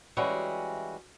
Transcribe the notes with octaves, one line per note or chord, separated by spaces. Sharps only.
E3 G3 G#3 C#4 F#4 E5